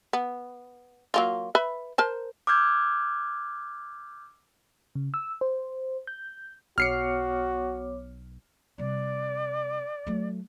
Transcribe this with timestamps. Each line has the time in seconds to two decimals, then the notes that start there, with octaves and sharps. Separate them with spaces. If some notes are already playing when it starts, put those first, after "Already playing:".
0.13 B3
1.14 F#3 A#3 F4
1.55 B4 E5 B5
1.98 A#4 C5 A5
2.47 D6 E6 F6 G6 G#6
4.95 C#3
5.14 E6
5.41 C5
6.07 G6
6.78 B1 B3 F#4 C#5 D6 F6 C7 C#7
8.78 C3 G3 D5
10.07 F#3 A3